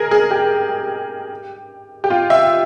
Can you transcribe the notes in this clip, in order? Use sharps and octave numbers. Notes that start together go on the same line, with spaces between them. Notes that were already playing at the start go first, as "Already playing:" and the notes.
Already playing: G#4 A#4
G#4
G4
G4
F4
E5